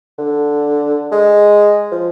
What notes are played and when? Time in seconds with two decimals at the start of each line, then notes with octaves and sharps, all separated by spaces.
0.18 D3
1.12 G#3
1.92 F3